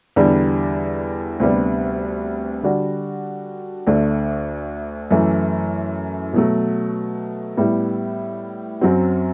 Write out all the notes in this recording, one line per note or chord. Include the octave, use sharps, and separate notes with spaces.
E2 D3 G3 D4
D2 C3 G3 B3 D4
D3 G3 D4 F#4
D2 D3 A3 D4
F#2 E3 A3 E4
B2 F#3 A3
A2 G3 B3 E4
F#2 F#3 C4 F#4